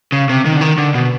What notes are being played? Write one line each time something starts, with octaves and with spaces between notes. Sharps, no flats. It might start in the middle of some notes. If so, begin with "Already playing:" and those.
C#3
C3
D#3
D3
D#3
D3
B2